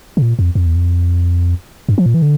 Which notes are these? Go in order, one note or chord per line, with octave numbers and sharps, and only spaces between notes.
C#3
A#2
F2
F2
E2
F2
G2
F3
A#2
E3
D3